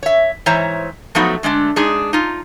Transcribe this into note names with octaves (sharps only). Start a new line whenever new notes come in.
C#5 E5
G#2 E3 C5 C#5 E5 A#5
F3 F#3 A3 B3 D#4 F#4
D3 G#3 A3 D4
G#3 D4 D#4 G#4
D#4 F4